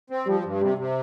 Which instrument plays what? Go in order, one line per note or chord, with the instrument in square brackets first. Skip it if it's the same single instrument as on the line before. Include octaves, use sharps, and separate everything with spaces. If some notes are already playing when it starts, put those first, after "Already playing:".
[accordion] C4
[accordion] F3 [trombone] G3
[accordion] G2
[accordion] C3 [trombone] G3
[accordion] C3